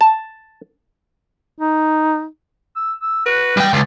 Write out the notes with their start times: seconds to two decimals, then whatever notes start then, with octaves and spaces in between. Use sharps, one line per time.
0.01 A5
1.58 D#4
2.76 E6
3.02 E6
3.26 F#4 B4
3.57 G3 D#4 G5
3.73 C#2 A5